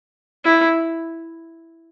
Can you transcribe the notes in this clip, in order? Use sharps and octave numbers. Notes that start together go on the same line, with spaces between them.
E4